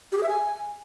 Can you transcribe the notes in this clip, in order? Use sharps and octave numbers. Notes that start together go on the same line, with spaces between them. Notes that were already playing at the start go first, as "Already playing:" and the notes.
G4
G#4
E5
G#5